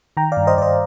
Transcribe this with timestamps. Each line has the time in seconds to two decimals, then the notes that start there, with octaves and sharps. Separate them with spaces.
0.17 D#3 G5 A#5
0.32 G2 D5 F5
0.47 C5 D#5
0.57 G2 D5
0.62 C5 D#5